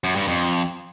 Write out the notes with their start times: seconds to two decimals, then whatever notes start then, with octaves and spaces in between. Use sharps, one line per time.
0.04 F#2
0.16 G2
0.28 F2